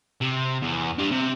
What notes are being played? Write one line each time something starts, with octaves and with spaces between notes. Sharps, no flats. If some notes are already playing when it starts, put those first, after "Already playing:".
C3
E2
G3 D4
C3